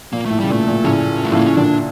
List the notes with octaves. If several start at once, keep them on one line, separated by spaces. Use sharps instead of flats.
A#2 A#3
A2 A3
C#3 G3
A#2 A3
A#2
A2 C#3 C#4
A3
A2 C#3 A#3
C#4
A#2 D3 D4